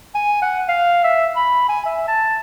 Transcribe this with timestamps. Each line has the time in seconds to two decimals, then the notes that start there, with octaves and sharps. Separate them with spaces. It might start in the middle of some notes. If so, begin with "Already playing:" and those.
0.15 G#5
0.42 F#5
0.68 F5
1.04 E5
1.36 B5
1.69 G#5
1.86 E5
2.08 A5